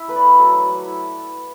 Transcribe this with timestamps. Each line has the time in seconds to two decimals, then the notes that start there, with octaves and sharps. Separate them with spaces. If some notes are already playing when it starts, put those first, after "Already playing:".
Already playing: E4 E5
0.08 A3 B4
0.16 D5
0.24 A3
0.39 F#3 A4
0.55 F#3
0.70 F#3
0.86 E4